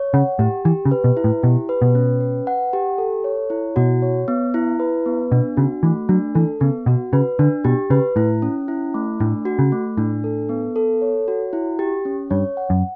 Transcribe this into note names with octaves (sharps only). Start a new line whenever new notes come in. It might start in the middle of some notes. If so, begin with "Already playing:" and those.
Already playing: C#5
C#3 F#5
A2 G4
E3 G4
C#3
B4
B2
E4
A2
B2 G4
B4
B2
C#4
B4
F#5
G4
A4
C#5
E4
B2 F#4
C#5
B3
E4
B4
B3
B2 D4
C#3 F#4
E3 A3
F#3 D4
E3 A4
C#3 B3
B2 F#4
C#3 B4
D3 D4
B2 G4
C#3 B4
A2 E4
C#4
E4
A3
A2 D4
F#4
C#3
A3
A2 D4
A4
B3
A4
C#5
F#4
E4
G4
C#4
G2 C#5
F#5
F#2